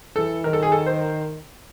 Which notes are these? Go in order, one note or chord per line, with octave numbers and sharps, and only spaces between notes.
E3 A4
D#3 A#4
A4
G#4
A4
C5